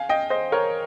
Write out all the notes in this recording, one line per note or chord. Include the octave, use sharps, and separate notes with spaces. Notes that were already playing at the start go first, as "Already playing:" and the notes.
Already playing: F5 G#5
D#5 G5
C5 D#5
A#4 C#5